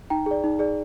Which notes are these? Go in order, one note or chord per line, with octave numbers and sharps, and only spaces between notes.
D#4 G5 A#5
G#4 D5
D#4
G#4 D5